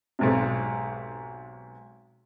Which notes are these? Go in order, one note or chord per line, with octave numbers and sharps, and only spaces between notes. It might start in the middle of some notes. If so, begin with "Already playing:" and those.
B1 G#2 C3